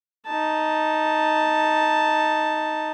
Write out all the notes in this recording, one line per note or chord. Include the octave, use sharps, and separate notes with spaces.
D#4 A5